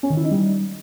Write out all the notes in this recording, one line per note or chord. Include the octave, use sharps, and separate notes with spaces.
C#4
D#3
E4
D#4
G3